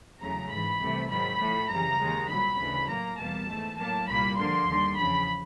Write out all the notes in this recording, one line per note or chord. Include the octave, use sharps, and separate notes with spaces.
E2 C#3 F#3 A3 A#5
G#2 E3 G#3 B5
C2 C3 E3 A3
G#2 D#3 F#3 B5
A2 F3 A3
F#2 C#3 E3 G3 A#5
D#2 D#3 G#3
C2 A#2 F#3 B5
D2 C#3 E3
A2 F#3 A#3 A#5
E2 B2 G3 A#3 A5
G#2 E3 A3
A2 F#3 A#3 A5
C2 A#2 G3 A#3 B5
G2 D3 F3 A#3 C6
D#2 D3 G3
E2 C#3 F3 B5